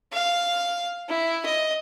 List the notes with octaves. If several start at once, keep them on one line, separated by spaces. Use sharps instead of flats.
F5
E4
D#5